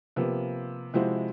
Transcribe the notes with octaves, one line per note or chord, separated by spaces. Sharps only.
C3 F3 A#3 B3
C3 F3 G#3 E4 F#4 C5